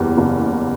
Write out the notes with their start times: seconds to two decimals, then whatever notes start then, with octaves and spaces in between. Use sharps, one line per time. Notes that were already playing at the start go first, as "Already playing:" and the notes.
Already playing: F#1 E2 G3
0.18 F#1